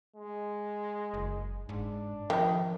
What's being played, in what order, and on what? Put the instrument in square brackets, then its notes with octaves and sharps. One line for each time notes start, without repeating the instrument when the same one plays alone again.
[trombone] G#3
[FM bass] F#1
[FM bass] G#2 [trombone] D4
[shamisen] D#3 E5 [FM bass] F3